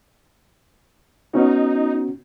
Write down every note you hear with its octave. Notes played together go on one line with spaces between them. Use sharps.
B3 C#4 D#4 F#4